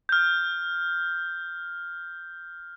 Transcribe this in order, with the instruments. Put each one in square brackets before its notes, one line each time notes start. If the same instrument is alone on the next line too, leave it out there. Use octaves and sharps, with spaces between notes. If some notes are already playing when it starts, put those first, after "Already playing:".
[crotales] F6 G6